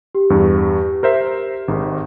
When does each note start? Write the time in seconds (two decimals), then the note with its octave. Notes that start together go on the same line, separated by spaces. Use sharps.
0.15 G4
0.30 E2 G2
1.03 A#4 C5 E5
1.68 G#1 G#2